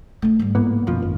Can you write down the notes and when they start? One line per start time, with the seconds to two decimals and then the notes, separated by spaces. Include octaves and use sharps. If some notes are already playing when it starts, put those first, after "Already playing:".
0.22 A3 D4
0.39 G#2 G3
0.55 A2 A#3 B3
0.87 F#2 B2 F3 D4
1.02 G#1